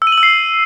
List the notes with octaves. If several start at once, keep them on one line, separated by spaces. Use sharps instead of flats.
E6
D#7
F#7
E6
C7